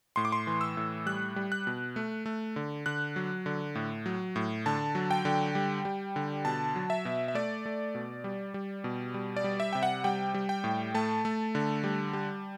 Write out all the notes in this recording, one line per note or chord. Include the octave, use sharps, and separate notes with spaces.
A2 C6
D6
C6
E3
E6
A2
G3 F#6
G3
F#6
B2
A3
A3
D3
D3 F#6
F#3
D3
A2
F#3
A2
D3 A5
F#3
G5
D3
G3
G3
D3
B2 A5
F#3
E5
B2
E5
A3 D5
A3
B2
G3
G3
B2
G3
D5
G3
E5
C3 G5
F#5
G3 G5
G3
G5
A2
A3 A5
A3
D3
G3
G3